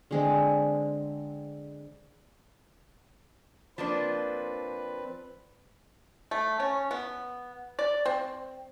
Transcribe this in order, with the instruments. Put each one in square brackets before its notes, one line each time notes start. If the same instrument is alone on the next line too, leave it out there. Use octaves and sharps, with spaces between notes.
[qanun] D3 G#3 C4
[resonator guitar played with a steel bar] F3 A#3 D4 [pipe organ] C4 B4
[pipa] A3
C#4
B3
D5
C4